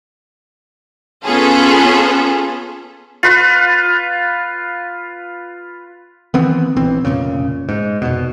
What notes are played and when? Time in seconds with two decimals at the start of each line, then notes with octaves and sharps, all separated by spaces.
1.25 B3 C#4 F4 G#4 A4
3.23 F4 B4
6.34 D#3 E3 B3 C4
6.76 A#1 E3 C4
7.05 F1 C2 A#2 C#3
7.69 G#2
8.02 F1 B2